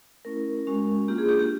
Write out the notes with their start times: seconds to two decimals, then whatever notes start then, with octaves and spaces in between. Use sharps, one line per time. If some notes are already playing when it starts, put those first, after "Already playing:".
0.25 A3 C#4 E4 A#4
0.67 G#3 C#4 F#4
1.08 A#3 D4 F4 G4
1.18 G#4
1.29 G4
1.39 G4